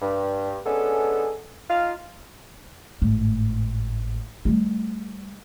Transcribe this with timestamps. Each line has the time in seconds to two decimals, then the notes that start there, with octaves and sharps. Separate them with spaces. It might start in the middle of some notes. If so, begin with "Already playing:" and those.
0.02 G2
0.66 G#3 B3 C#4 D4 G#4 A4
1.69 D#4 F4 D#5 F5
3.02 G#1 A2
4.45 G3 A3